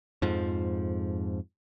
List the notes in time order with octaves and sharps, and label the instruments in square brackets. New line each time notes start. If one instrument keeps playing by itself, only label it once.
[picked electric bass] F2 G#2 F3